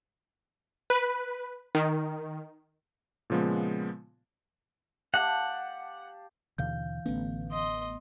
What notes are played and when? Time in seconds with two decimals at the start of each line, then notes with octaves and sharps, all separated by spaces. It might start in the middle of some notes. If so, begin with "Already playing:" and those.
0.90 B4
1.75 D#3
3.30 A#2 C#3 F3 G#3 B3
5.14 G4 F5 F#5 A5
6.58 D#2 B2 D3 E3 F5 G6
7.05 A1 D3 A3 B3 C#4
7.52 D#5 C6